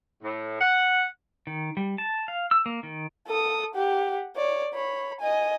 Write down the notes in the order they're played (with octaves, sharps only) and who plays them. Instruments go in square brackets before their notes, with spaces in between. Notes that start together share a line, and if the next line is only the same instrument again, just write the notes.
[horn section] A2
F#5
[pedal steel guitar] D#3
G3
A5
F5
E6
A#3
D#3
[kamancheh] A4 D#6
G4 F#5
C#5 D5
C#5 B5
D#5 G#5